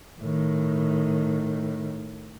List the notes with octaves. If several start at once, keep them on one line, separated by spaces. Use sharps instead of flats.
A2 D#3